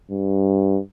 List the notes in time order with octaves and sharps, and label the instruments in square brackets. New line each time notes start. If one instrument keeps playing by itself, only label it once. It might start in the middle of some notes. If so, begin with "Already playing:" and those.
[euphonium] G2